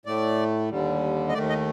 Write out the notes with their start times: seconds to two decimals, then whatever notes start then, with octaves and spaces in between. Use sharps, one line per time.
0.06 A2 A3 D5
0.69 D#2 D3 G3
1.29 D#5
1.34 D#2 D#3 A3 D5
1.49 D#5